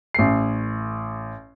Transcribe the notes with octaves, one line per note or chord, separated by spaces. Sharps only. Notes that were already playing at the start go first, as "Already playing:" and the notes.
A1 C7